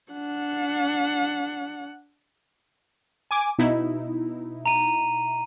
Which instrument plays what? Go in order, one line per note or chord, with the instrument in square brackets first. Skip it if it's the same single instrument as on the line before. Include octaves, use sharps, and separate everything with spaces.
[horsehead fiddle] D4 F#5
[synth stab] G#5 D6
B2 D#4 E4
[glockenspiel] A#5 D#7